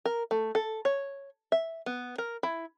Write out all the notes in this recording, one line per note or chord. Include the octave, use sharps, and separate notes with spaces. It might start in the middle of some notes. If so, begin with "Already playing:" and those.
A#4
A3
A4
C#5
E5
B3
A#4
E4